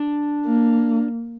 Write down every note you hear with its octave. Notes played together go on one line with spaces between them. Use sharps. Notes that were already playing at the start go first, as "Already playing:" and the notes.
Already playing: D4
A#3